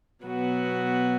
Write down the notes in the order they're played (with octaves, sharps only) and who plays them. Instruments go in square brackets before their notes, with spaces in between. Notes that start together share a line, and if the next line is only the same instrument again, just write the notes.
[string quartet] B2 F#3 B3 F#4